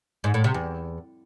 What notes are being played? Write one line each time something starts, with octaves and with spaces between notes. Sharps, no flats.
G#2
A2
C3
E2